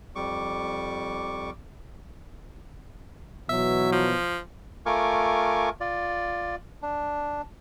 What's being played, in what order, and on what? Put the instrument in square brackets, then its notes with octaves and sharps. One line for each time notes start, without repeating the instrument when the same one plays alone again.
[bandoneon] F2 G3 C#6 D6
[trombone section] B2 E3 F#3 [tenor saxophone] E5
[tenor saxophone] F3
[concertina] A3 F4 A#4 G#5 C#6 D6
F4 D5
D4